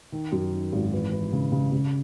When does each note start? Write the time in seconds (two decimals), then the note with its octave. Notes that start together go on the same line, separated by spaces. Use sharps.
0.12 D#3
0.32 F#2
0.53 D#3
0.72 G#1
0.93 E3
1.12 E3
1.33 C#3
1.52 C#3
1.72 C#3